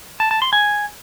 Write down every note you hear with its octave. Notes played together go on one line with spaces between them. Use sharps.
A5
A5
C6
G#5